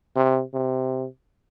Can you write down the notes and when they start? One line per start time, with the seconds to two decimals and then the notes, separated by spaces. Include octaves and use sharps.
0.16 C3
0.54 C3